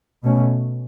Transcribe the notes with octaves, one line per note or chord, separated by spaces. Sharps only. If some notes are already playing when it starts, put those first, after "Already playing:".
B2 A3 C#4